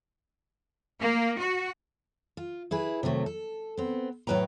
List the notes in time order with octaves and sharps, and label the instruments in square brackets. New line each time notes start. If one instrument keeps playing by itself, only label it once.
[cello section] A#3
F#4
[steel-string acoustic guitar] F4
E4 G#4 B4
C3 D#3 F#3 A3
A4
B3 C4
A2 F#3 B4 G5 A#5